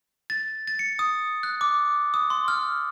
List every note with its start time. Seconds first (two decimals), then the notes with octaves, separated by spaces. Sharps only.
0.30 A6
0.67 A6
0.79 C#7
0.99 D#6
1.43 F#6
1.61 D6
2.14 D#6
2.30 C6
2.48 F6